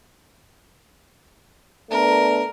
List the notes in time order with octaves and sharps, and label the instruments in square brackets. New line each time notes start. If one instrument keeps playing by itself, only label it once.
[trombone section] A3 B3 D4 [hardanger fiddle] A#4